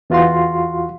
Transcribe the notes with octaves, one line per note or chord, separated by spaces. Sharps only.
E2 E3 F4 F#4 F5 C6